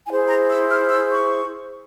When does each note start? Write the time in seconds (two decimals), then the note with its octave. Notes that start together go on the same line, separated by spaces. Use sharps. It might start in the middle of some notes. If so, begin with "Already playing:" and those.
0.07 E4 G#4 C5 G#5
0.28 A#5
0.50 E6
0.70 F6
0.91 E6
1.12 C#6